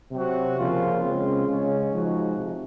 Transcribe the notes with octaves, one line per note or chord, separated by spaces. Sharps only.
C3 F#3 C4 F#4
C#3 F3 A#3 F4
C#3 G#3 C4 F4
C#3 G#3 C#4
F3 G#3 D#4 F#4
C3